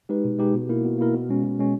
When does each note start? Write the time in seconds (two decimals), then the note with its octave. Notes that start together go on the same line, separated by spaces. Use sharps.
0.09 G#3 D#4 G4 B4
0.25 B2
0.38 G#3 D#4 G4 B4
0.54 B2
0.69 A#3 E4 A#4
0.84 B2
0.98 A#3 E4 A#4
1.14 B2
1.29 G#3 C#4
1.44 B2
1.59 G#3 C#4